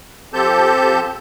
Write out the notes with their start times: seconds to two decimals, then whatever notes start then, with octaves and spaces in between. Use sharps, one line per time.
0.33 F3 C4 G4 A4 A5 G6